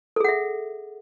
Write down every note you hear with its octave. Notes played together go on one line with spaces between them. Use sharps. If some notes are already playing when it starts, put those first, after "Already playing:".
G#4 A4 E5 F#5